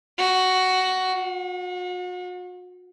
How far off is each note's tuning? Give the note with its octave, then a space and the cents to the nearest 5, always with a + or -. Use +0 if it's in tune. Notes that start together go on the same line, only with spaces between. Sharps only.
F#4 +10
F#4 -40